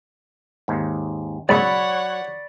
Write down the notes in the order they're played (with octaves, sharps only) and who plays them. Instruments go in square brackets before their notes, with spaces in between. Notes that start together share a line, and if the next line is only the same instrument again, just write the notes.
[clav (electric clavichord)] D#2 G#2
[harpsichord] G#2 C#3 [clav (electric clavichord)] F#3 [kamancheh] C#5 F#5 [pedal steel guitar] D5 B5 C#6